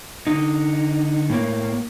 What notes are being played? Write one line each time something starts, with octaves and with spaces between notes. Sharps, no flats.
D3 D#4
A2 A#3